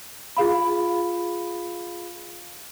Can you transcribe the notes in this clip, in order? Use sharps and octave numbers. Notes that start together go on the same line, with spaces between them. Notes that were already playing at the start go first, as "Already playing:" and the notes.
F4 G#4 F5 B5